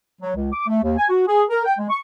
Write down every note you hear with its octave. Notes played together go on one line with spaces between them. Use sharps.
F#3
C#2
D6
A3
D#2
G#5
F#4
G#4
A#4
G5
G#3
C#6